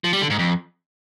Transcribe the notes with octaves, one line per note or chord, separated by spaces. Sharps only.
F3
G3
D3
G#2
F2